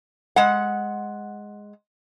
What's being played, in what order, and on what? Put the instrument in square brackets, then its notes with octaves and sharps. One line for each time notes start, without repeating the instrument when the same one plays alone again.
[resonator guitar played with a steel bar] G#3 F#5